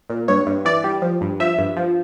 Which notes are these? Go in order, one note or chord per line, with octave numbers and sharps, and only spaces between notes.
A#2
G2 C#5
G2
E3 D5
G3
F3
G2
F3 E5
G2
F3